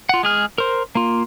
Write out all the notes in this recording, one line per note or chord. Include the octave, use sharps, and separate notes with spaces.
F4 F#5
G#3 G#4 F6
A#4 C5
A#3 F4